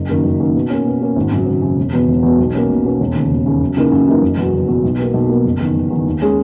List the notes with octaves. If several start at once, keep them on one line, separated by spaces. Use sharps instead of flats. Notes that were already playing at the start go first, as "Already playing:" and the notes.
Already playing: F#1
F#2 D#3 A#3
F#1
F#2 D#3 A#3
B2
A#3 C#4
B2
A#3 C#4
G#1
F#2 C#3 F#3
G#1
F#2 C#3 F#3
E1
E2 B2
E1
E2 B2
B1
B2 A#3 C#4
B1
B2 A#3 C#4
E1
D#2 C#3
E1
D#2 C#3
F#2
C#3 E3 A#3 D#4
F#2
C#3 E3 A#3 D#4
F#1
E2 B2 F#3
F#1
E2 B2 F#3
B1
B2 A#3
B1
B2 A#3
F#1
E2 D#3
F#1
E2 D#3
D#2
D#3 G#3 C#4 G#4